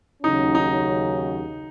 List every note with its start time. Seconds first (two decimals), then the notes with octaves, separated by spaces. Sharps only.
0.23 D#2 C#3 F#3 C#4 D#4
0.55 D#4